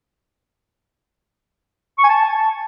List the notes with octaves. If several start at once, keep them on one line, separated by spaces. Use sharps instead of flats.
C#6
G#5
A5